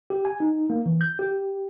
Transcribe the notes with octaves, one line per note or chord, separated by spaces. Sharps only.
G4
G#5
D#4
A#3
E3
G6
G4